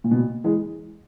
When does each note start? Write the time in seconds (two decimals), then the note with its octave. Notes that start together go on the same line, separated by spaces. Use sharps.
0.04 A#2
0.11 B2
0.18 A#2
0.44 E3 G#3